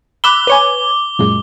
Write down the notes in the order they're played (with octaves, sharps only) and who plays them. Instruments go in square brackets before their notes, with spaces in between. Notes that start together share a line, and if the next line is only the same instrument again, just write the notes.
[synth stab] B5 E6 F#6 [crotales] D6 G7
[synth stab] B4 C#5 G#5
F#2 A#2 G#3